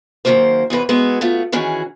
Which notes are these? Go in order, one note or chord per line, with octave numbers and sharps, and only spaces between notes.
F#2 D#3 F3 F#3 A#3 C5
E2 C3 E3 B4
G#3 B3 E4 F#4
A3 B3 F4 F#4
D#3 E3 C#4 F#4 G#4